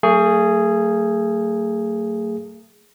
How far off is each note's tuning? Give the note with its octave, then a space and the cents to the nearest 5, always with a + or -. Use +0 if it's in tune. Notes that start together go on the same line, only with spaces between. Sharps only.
F#3 +0 A3 +40 G#4 +0